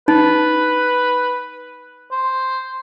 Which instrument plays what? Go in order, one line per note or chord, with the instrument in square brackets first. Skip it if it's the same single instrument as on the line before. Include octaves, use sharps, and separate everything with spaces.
[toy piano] D#4 [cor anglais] B4
[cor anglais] C5